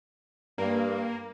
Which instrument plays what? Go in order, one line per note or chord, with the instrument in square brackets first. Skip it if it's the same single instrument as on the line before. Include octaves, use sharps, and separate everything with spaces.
[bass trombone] G2 [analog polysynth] A#3